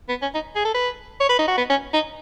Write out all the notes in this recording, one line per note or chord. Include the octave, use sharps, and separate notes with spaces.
B3
C#4
D#4
G#4
A4
B4
C#5
B4
D#4
F#4
B3
C#4
D#4